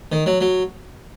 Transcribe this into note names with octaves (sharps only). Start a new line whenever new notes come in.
D#3
F#3
F#3